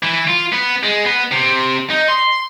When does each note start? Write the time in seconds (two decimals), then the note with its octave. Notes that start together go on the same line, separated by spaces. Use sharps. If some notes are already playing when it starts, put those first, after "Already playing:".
0.03 E3
0.27 F4
0.52 B3
0.83 G#3
1.05 B3
1.31 C3
1.90 D#4
2.08 C6